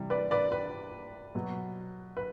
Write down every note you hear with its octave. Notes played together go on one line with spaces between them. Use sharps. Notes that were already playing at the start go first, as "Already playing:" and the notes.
Already playing: C3 E3 G3
B4 D5
B4 D5
B4
B2 F#3
B4